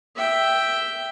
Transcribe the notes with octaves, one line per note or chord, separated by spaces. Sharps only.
E5 G5